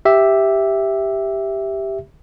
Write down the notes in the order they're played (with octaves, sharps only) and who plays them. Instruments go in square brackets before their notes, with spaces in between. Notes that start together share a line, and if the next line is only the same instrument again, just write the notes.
[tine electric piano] G4 E5